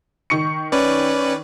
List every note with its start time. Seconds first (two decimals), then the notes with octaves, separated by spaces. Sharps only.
0.30 D#3 C#6 C#7
0.72 C#4 B4 D5